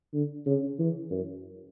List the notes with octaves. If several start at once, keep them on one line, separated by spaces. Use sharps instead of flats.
D3
C#3
E3
F#2